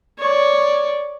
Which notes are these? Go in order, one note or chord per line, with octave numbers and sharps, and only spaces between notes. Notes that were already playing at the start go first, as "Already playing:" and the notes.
C#5 D5